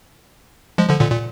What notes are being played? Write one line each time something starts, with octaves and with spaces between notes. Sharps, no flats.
F3 G#3
D3 F3
A#2 D3
A#2